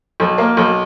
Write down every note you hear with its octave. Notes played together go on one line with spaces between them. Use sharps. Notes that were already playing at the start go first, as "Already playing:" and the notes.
B1
A#3
B1